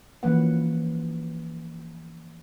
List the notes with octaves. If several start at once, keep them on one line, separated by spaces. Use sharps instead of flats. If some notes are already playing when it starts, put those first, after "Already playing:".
E3 F3 A#3 C#4 B4 F#5